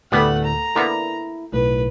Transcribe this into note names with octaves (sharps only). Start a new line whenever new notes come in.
D2 A2 G3 A3 B3 F#5
A#5
D3 A#3 B3 E4
B1 A2 B4